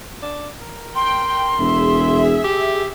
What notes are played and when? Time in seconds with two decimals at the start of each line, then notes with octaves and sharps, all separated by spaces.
0.22 D4
0.61 A#4
0.96 G5 C6
1.59 E1 G#4 E5
2.44 G4